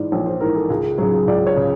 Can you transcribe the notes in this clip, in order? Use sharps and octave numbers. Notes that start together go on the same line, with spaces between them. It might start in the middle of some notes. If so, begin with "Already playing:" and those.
Already playing: G#2 E3 G#4 D5
A#1 C#5
C5
G#2 E3 A#4
A4
C#2 G#4
C#3 F#3 G#4
C#2 D5
C#5
C#3